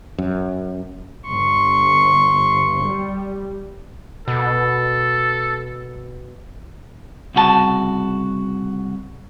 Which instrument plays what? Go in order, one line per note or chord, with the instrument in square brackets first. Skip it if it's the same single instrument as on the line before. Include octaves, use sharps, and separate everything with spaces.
[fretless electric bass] F#2
[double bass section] G1 [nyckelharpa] C6 C#6
[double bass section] G3
[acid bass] B2 [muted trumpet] A4
[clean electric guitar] C2 C#3 F#4 G#4 A5